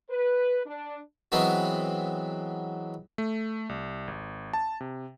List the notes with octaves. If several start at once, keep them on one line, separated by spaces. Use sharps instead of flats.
B4
D4
E3 F#3 G#3 B3 C4
A3
C2
G#1
A5
C3